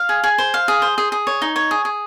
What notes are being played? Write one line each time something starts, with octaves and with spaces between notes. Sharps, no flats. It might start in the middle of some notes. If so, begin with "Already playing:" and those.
Already playing: F5
G#4
G#4
C5
F5
G#4
C5
G#4
G#4
C#5
D#4
C#5
G#4
G#4